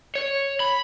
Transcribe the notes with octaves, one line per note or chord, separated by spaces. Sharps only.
C#5
B5